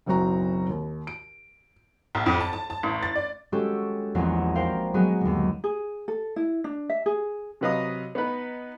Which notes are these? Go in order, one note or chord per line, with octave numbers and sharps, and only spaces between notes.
F#1 B1 C4 F#4 A#5
D#2
D7
B1
F2
A5
A5
A5
A1
A6
D5
G#3 C#4 F#4 G4 A4
A#1 E2 C4 C#4 D#4 F#5
A#4 C5 F5 G5
F#3 G#3 B3 D#4 F#4 G#4
G1 D#2
G#4
A4
E4
D4
E5
G#4
C3 F#3 B4 D#5 F5 D#6
B3 D#4 B4